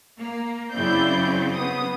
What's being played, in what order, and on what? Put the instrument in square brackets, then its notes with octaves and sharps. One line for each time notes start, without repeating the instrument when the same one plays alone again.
[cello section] A#3
[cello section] F#2 C#3 C4 [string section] E4 D5 G6
[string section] B3 D#6